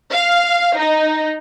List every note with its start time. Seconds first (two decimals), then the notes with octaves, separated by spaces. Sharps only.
0.12 F5
0.77 D#4